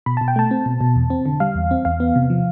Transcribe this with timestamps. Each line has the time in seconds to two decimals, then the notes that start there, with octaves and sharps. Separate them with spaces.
0.06 B2 B5
0.17 B2 A5
0.28 G5
0.36 A3 A5
0.51 C4
0.66 B2
0.81 B2
0.96 E2
1.10 C4
1.26 D3
1.40 G3 F5
1.55 E2
1.71 C4
1.85 E2 F5
2.00 B3
2.16 C3
2.30 F3